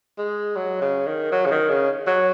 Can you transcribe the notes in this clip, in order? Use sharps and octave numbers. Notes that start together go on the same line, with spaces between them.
G#3
F#3
C#3
D#3
F#3
C#3
D#3
C#3
F#3